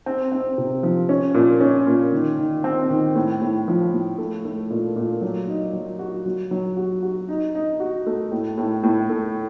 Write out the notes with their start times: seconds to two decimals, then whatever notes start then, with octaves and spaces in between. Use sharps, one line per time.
0.06 C4
0.32 C4
0.58 C3
0.83 F3
1.09 C#4
1.34 A#2
1.61 C#4
1.86 A#2
2.13 D#3
2.39 D#3
2.64 C4
2.90 D#3
3.15 A2
3.41 A2
3.68 F3
3.93 A2
4.18 A3
4.45 A3
4.70 A#2
4.96 A#2
5.22 F#3
5.48 D#4
5.73 F#3
5.99 F#4
6.26 F#3
6.51 F#3
6.77 F#4
7.03 F#4
7.29 D#4
7.55 D#4
7.80 F#4
8.07 A3
8.32 A2
8.58 A2
8.83 A2
9.09 A3